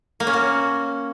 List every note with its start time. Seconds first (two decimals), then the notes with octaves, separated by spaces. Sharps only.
0.20 A#3
0.27 C#4
0.34 F#4